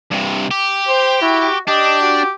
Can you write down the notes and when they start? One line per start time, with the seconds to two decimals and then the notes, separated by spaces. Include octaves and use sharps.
0.11 G2 C3
0.51 G4
0.88 C5
1.22 E4 F#4
1.67 D4 G4 D#5
2.01 F#4